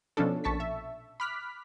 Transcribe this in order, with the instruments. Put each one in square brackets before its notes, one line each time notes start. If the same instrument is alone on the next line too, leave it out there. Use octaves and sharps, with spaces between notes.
[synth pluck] B2 F3 C#4 D4 A4
A#1 A5 C#6 B6
E5
B5 D6 F6 F#6 B6